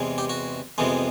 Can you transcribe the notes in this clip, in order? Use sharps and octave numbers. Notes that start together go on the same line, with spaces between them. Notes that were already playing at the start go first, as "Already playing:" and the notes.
Already playing: E2 C3 E3 G#3
G4
F#4
F2 C3 E3 G#3 B3